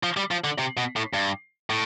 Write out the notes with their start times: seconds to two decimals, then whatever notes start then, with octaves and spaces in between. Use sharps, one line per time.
0.03 F3
0.17 G3
0.31 F3
0.44 D3
0.58 C3
0.77 B2
0.96 A2
1.13 G2
1.70 A2